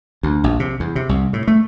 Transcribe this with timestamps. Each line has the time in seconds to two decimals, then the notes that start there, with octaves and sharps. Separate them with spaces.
0.23 D2
0.44 A#1
0.60 C3
0.80 E2
0.96 C3
1.09 C2
1.33 A2
1.48 A3